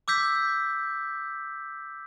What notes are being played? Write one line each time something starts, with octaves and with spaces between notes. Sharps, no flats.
D6 E6 G6 B6